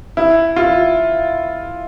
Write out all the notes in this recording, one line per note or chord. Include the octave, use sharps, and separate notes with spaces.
E4
F4